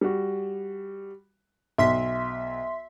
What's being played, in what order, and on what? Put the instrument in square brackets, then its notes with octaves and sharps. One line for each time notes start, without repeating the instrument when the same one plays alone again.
[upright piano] G3 F#4
[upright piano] B1 [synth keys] E5 C6 B6